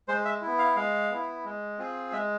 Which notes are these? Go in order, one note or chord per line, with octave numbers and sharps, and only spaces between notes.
G#3 C5
E5
E4
B3
F5
G#3 F5
B3 E4
G#3
C4 F4 G#4
G#3 E5